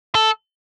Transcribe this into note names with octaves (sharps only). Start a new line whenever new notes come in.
A4